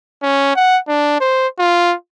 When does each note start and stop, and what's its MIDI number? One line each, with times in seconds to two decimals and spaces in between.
0.23 0.53 61
0.56 0.78 78
0.88 1.17 62
1.21 1.48 72
1.59 1.94 65